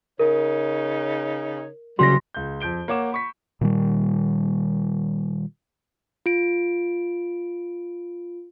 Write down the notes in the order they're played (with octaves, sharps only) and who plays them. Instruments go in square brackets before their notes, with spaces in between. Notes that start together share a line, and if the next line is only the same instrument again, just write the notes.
[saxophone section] C#3 D#4 C#5 [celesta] A#4
[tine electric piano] C#3 F#3 F#4 [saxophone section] E3 G3 [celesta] C6 A#6
[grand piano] C#2 G6
F2 G6 D7 G7
A#3 C#5 F#5 D6 E7
B5 C#6 B6
[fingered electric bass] A#2 D#3 G3
[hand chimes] F4 D7